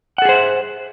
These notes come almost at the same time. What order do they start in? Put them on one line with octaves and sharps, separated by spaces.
F#5 A4 G#4 C5 E5